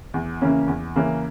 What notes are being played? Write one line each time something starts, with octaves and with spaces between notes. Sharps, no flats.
E2
C#3 E3 A#3 C#4
E2
C#3 E3 A#3 C#4